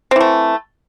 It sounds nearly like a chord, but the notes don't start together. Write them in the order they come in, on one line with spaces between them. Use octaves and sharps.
C4 E3 A3